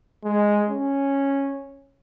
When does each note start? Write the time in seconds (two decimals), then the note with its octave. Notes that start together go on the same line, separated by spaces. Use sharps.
0.24 G#3
0.69 C#4